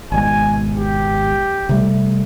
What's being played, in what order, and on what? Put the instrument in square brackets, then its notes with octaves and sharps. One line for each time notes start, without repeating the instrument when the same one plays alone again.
[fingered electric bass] G#1 B2 G#3 [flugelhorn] G#5
[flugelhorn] G4
[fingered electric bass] C3 G3 A3